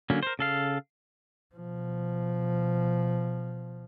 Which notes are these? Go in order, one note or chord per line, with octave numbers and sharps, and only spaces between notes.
D3 F#3 A#3 C#4
A#4 C5
C#3 A4 F5
B2 F3